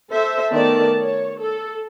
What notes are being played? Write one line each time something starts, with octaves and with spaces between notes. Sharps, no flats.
A4 C5 E5
D#3 A3 B3 D5 A5
C#5
A4